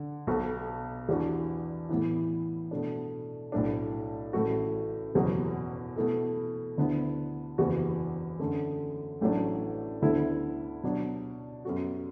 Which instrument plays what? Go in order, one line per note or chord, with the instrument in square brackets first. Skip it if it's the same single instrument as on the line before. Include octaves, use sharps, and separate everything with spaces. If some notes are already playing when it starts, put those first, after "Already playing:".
Already playing: [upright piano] D3
B1 B2 B3 F#4 A4
E2 E3 D4 F#4
A2 E3 B3 E4
B2 A3 D4
B1 A2 A3 D4
A1 A2 A3 F#4
F#1 E2 B2 F#3
B2 A3 E4 A4
D2 D3 B3 E4
F#1 E2 E3 B3 F#4
F#2 D3 A3
A1 A2 F#3 A3 D4
D2 D3 B3 E4 A4
B2 F#3 D4
F#2 F#3 B3 F#4 A4